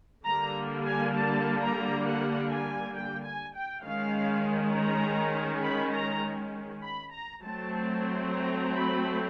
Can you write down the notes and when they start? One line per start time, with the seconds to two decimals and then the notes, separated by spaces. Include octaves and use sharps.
0.25 D3 G3 A#3 A#5
0.86 G#5
1.15 A5
1.59 A#5
2.05 F#5
2.49 G#5
2.94 G5
3.24 G#5
3.55 G5
3.84 D#3 G#3 C#4 F5
4.74 A#5
5.63 B5
5.94 A#5
6.82 B5
7.12 A#5
7.42 F#3 A3 C4 A5
8.32 A#5
8.76 B5